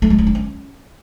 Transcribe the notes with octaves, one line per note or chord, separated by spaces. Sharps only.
A3
G#3
C#4
D4
C#4